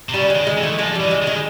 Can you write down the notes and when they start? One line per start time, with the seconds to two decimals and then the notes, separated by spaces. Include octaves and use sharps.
0.09 C3
0.13 C#3 G3
0.30 G#3
0.35 D#3
0.47 G#3
0.57 E3
0.63 A3
0.79 F3 G#3
0.95 E3 G3
1.11 G#3
1.22 D#3 G#3